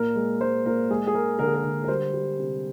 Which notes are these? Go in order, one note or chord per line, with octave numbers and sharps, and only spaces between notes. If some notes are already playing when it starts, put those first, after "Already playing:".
Already playing: A#2 A#4
G#3
G#3 C5
A#2 A#4
G#3 G#4
G#4
G#3 A#4
D3 A#4
G#4
A#4
D3
A#4
G3 C5
G3
C3